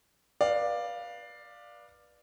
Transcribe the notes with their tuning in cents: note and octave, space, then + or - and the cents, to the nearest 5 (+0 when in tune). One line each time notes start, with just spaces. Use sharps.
B4 -25 D5 +10 F5 +0